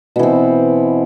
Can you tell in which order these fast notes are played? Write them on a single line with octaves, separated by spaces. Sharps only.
B2 E3 C4